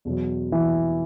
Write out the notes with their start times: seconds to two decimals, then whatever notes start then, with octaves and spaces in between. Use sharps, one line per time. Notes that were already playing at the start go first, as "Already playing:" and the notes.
0.05 E2 B2 F#3
0.52 E3 E4